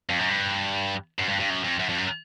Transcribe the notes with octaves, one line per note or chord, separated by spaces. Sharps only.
F2
F#2
G2
F#2
G2
G2
F#2
F2
F#2
F2
F#2